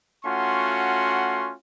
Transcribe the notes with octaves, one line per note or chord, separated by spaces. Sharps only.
A3 C#4 F4 F#4 F#5 C6